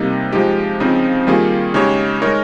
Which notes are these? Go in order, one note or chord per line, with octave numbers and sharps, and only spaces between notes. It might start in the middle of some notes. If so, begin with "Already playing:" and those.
Already playing: C3 G3 A#3 D#4
F3 G#3 D#4 G4
C#3 F3 C4 D#4
D#3 G3 A#3 F4 G#4
C#3 G#3 D#4 G4 C#5
G#3 D#4 A#4 C#5